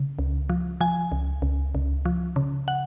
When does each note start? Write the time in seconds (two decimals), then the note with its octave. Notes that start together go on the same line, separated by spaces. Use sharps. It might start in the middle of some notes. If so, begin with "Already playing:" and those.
Already playing: C#3
0.19 C#2
0.49 F3
0.81 F3 G#5
1.12 C#2
1.42 C#2
1.75 C#2
2.05 F3
2.36 C#3
2.68 F#5